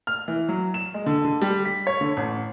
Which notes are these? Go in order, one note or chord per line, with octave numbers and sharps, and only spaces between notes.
F6
E3
F#3
E7
G#3
D3
D3
G3
B6
C#5
D3
A1